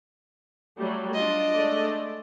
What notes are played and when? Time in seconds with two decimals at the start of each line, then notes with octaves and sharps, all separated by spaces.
0.78 F#3 G3 A3
1.14 D4 F4 D#5
1.55 G#3 A3 D5